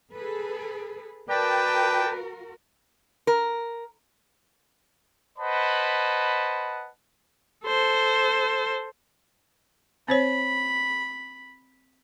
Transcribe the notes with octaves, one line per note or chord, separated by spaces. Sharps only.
G#4 A4 B4
F#4 A#4 B4 D5 G5 A5
A#4
B4 C5 D#5 F#5 A5 B5
A4 C5
C4 C5 C#5 B5